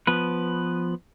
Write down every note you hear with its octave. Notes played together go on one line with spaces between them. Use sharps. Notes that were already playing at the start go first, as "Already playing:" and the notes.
F3 B3 B4